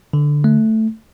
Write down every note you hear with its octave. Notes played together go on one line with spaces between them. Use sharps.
D3
A3